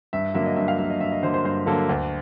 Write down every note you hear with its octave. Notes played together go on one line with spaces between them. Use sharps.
G2 E5
D3 F#3 A#3 E5
D#5
G2 E5
F5
D3 F#3 A#3 E5
D#5
G2 E5
D#5
D3 F#3 A#3 C5
C5
G2 C5
D3 F#3 A#3 A4
D2